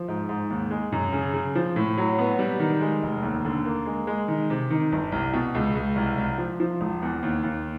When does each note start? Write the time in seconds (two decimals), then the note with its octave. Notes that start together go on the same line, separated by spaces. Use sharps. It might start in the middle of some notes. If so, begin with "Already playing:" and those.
Already playing: F3
0.08 G#2
0.29 G#2
0.50 D#2
0.71 G#3
0.92 F#2
1.12 C#3
1.34 C#3
1.55 F3
1.76 A2
1.98 F#3
2.19 B3
2.39 G3
2.60 D#3
2.81 G#3
3.03 F1
3.23 D#2
3.45 D3
3.65 A#3
3.86 G#3
4.07 G#3
4.28 D#3
4.50 C3
4.71 D#3
4.92 G1
5.12 C2
5.33 B2
5.55 C#2
5.75 C#2
5.96 C2
6.18 C2
6.38 F3
6.60 F3
6.81 E1
7.02 E2
7.23 D#2
7.43 D#2